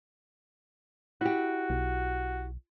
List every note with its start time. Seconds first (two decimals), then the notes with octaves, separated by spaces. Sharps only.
1.21 E4 F#4 G4
1.70 B1